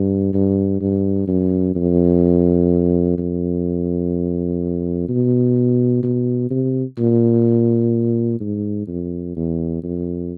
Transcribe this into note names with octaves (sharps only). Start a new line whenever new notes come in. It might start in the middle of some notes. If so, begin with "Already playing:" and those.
Already playing: G2
G2
G2
F#2
F2
F2
B2
B2
C3
A#2
G#2
F2
E2
F2